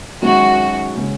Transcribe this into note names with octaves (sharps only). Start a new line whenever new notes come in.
F#2 D#3 G#3 C#4 F#4
C#3 G#3 C#4